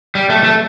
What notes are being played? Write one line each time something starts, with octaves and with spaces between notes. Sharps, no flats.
G3
A3
A3